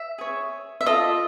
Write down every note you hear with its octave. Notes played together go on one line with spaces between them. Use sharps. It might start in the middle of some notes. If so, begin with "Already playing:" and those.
Already playing: E5
G#4 C#5
E5
F4 A4 D5 D#5